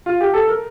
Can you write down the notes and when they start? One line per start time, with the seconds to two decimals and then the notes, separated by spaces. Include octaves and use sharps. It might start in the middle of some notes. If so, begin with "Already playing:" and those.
0.06 F4
0.21 G4
0.34 A4
0.48 A#4